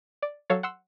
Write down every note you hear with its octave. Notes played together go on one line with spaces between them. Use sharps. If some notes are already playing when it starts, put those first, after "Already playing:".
D5
F#3 A4 C#5 F5
F#5 C6 E6